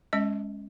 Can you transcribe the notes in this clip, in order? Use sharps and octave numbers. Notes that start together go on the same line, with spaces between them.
G#3 C#4 D#5